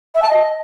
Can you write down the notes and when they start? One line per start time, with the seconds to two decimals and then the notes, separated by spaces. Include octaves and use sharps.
0.14 E5
0.22 A5
0.29 D#5